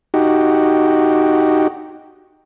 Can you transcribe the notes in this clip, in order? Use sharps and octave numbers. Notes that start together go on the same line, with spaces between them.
D#4 F#4 G4